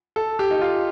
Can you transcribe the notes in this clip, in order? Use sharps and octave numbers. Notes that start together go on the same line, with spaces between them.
A4
G4
D#4
F4